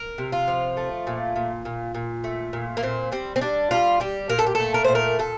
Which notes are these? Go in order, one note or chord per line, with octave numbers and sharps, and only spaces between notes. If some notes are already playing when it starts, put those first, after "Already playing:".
Already playing: A#4
C3
F4
F3
A3
A#2
A#2
A#2
A#2
A3
A#2
A#3
A#2 C4
G3 C4
C4
G3 D4
G3 F4
G3 G4
A#2 A#4
A4
G4
A3 A4
A#4
A#2 C5
A#4
A#2 A4